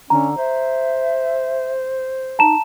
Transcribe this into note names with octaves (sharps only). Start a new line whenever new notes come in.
D3 C#4 A#5
C5 E5
D#4 A5 A#5 E7